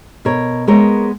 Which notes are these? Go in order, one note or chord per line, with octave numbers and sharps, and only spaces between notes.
B2 A#4 C#5
G#3 B3 A#4 C#5